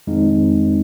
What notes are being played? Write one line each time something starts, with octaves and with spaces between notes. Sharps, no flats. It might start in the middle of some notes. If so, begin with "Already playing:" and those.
F2 D#3 G#3 C4 D#4